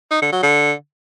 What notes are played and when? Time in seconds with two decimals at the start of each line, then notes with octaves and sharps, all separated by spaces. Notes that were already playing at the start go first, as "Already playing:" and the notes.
0.11 D#4
0.22 D3
0.33 F#3
0.43 D3